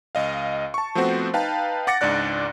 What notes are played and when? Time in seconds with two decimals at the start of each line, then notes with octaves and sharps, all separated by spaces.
0.15 C#2 D#5 F5
0.74 A5 C#6
0.95 F3 A3 B3 C4 F#4 C5
1.34 D#4 B4 F5 G5 A5
1.87 F#5 D6 A6 A#6 C#7
2.01 C#2 G#2 D4 D5 F#6